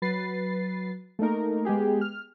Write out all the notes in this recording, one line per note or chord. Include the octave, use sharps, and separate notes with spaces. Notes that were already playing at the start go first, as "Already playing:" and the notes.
F#3 B4 A6 C7
A3 A#3 D#4 A#4
G#3 B3 G4 G#4
F6